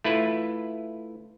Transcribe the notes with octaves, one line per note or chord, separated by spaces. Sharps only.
A3 E4 F4 B4